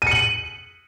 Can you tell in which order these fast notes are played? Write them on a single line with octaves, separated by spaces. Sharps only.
D#7 C#7 F#7